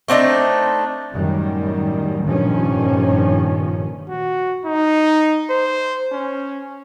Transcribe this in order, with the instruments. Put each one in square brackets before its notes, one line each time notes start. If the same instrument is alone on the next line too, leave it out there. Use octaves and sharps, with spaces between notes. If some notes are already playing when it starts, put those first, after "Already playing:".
[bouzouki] A3 C4 D4 D#4
[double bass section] F#2 A2 D#3 G3
F1 G2 A#2 D#3 F3 C#4
[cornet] F#4
D#4
C5
C#4